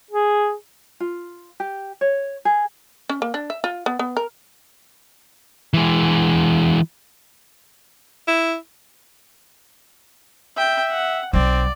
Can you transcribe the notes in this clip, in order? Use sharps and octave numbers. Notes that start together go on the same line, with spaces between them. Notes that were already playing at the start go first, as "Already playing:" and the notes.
G#4
F4
G4
C#5
G#4
C#4
A#3
D4
E5
F4
B3
B3
A#4
E3 G#3
E4
E5 G5
F#5
B1 F#3 C4 D5